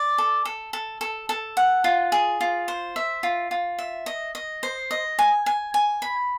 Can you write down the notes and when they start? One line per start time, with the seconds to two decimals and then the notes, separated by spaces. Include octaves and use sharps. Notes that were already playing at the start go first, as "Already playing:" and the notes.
Already playing: D5
0.18 A4
0.45 A4
0.73 A4
1.01 A4
1.29 A4
1.57 F#5
1.84 F4
2.12 G#4
2.41 F4
2.68 C5
2.96 E5
3.23 F4
3.51 F4
3.79 E5
4.06 D#5
4.35 D#5
4.63 C5
4.91 D#5
5.19 G#5
5.46 G#5
5.74 G#5
6.02 B5